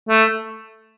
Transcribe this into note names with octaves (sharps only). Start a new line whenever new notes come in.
A3